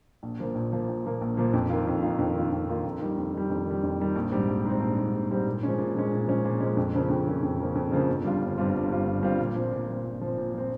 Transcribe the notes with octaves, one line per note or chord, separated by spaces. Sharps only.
A#1
A#2 F3 A#3
A#1
A#2 F3 A#3
A#1
A#2 F3 A#3
A#1
A#2 F3 A#3
F2
D#3 A#3 F4
F2
D#3 A#3 F4
F2
D#3 A#3 F4
F2
D#3 A#3 F4
F2
D#3 G3
F2
D#3 G3
F2
D#3 G3
F2
D#3 G3
A#1
G#2 G3 C4
A#1
G#2 G3 C4
A#1
G#2 G3 C4
A#1
G#2 G3 C4
A#2
F3 G#3 C#4
A#2
F3 G#3 C#4
A#2
F3 G#3 C#4
A#2
F3 G#3 C#4
F2
C#3 F3 A#3 C#4
F2
C#3 F3 A#3 C#4
F2
C#3 F3 A#3 C#4
F2
C#3 F3 A#3 C#4
G1
G2 G3 C4 F4
G1
G2 G3 C4 F4
G1
G2 G3 C4 F4
G1
G2 G3 C4 F4
A#2
F3 C4
A#2
F3 C4
A#2
F3 C4
A#2
F3 C4